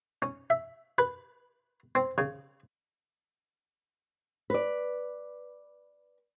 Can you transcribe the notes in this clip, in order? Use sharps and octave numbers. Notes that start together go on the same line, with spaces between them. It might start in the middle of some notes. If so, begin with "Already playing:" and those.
C#4
E5
B4
C4
C#3
B4 D5